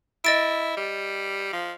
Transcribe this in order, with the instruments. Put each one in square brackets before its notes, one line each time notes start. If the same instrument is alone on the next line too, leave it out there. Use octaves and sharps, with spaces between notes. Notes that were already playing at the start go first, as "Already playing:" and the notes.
[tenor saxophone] E4 [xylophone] D#5 A6 D7
[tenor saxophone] G3
F3